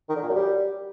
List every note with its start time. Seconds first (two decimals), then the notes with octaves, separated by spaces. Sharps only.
0.09 D#3
0.16 D3
0.22 A#2
0.29 F#2
0.35 G3